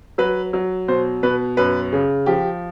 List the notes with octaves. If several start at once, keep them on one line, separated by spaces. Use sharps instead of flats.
F#3 B4
F#3
B2 C5
B2 B4
F#2 B4
C#3
F3 G4